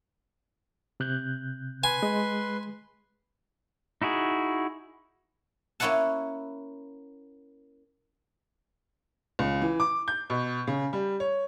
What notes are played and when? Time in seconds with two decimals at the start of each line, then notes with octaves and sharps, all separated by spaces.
1.00 C3 F#6 G6
1.84 B4 G#5 C6
2.03 G#3
4.02 D#4 E4 F#4 G#4
5.80 A#3 C#4 E4 C#5 F#5 A5
9.39 C#2
9.61 E3
9.80 D6
10.08 G6
10.30 B2
10.67 C#3
10.93 G3
11.20 C#5